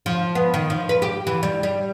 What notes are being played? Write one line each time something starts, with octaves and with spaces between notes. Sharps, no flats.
F3
B3
D#3
F3
B4
G4
E3
G3
G3